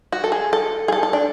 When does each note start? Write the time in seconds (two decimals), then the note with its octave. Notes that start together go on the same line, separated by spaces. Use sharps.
0.12 F#4
0.24 A4
0.32 G#4
0.53 A4
0.88 G#4
0.92 A4
1.03 A4
1.13 D4